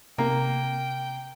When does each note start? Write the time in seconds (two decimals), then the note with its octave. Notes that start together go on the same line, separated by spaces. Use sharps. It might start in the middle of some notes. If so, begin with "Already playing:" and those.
0.18 C3 A#3 G5